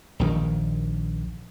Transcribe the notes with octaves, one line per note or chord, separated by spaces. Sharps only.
A#1 D#2 D#3